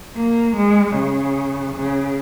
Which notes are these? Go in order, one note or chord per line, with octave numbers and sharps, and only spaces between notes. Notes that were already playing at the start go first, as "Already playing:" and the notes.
A#3
G#3
C#3
C#3